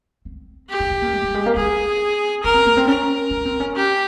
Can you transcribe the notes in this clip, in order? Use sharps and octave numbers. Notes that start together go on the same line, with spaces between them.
C4
G4
C#4
C#4
A#3
G#3
G3
G#3
A#3
C4 G#4
C#4 A#4
C4
A#3
C4
C#4 A#4
C#4
C4
C#4
G4